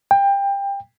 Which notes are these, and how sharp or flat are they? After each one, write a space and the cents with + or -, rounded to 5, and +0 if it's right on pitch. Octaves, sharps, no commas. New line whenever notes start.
G5 +25